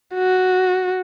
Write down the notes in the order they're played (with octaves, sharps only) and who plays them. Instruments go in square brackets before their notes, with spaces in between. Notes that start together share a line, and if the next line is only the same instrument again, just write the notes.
[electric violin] F#4